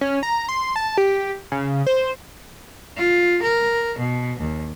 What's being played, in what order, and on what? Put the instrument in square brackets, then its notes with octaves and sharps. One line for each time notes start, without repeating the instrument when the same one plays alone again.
[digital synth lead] C#4
A#5
C6
A5
G4
C#3
C5
[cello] F4
A#4
B2
D#2